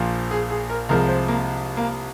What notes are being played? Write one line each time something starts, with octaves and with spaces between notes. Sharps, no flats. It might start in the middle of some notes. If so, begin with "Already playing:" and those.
Already playing: A#1 A#2 F3
G#4
G#4
A#4
C2 C3 F3 G#3 A#4
C5
A#3
A#3